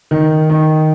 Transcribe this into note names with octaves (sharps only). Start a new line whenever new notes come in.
D#3
D#3